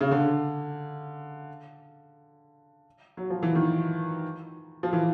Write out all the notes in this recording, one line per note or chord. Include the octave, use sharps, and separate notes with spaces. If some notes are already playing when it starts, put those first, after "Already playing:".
C#3
D3
F#3
F3
E3
D#3
F3
E3